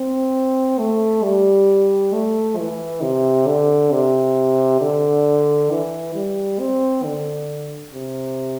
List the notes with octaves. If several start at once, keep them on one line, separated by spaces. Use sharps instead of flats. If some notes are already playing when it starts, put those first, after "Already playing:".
Already playing: C4
A3
G3
A3
E3
C3
D3
C3
D3
E3
G3
C4
D3
C3